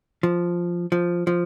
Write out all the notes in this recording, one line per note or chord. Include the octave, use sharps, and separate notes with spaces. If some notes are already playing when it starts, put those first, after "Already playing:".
F3
F3
F3